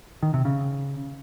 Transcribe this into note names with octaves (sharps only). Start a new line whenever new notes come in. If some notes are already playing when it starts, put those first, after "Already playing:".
D#3
C3
C#3